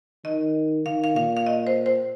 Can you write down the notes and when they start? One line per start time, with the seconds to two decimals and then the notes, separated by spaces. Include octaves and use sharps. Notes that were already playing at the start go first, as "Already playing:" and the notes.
0.24 D#3 D#5
0.86 D#3 F5
1.04 F5
1.16 A#2 F5
1.37 F5
1.47 D#5
1.67 C5
1.86 C5